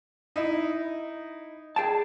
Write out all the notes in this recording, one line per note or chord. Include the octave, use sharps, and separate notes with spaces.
D#4 E4
G#4 G5 A5